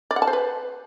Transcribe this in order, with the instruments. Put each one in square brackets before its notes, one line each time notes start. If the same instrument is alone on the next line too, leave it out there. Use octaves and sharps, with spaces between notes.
[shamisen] D5
F#5
A5
C5
B4